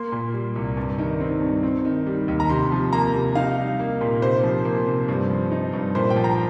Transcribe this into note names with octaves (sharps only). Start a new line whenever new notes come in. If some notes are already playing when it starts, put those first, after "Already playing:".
Already playing: A#3 C6
A#2
G3
C2
G2
D#3
C4
G2
C4
D#3
G3
D#2
A#5
C3 C6
F3
A#3 A#5
C3
D#4 F5
G3
A#3
A#2
C3 C5
F3
A#3
C3
G2
F3
D#4
G2
A#2 C5
G5
F3
A#5